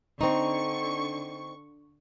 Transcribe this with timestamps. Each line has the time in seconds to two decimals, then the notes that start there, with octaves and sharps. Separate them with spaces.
0.21 D3 C4 D#4 C#6